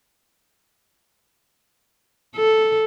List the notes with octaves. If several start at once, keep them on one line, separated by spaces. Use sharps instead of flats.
A4